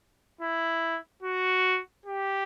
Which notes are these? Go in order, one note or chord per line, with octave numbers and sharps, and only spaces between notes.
E4
F#4
G4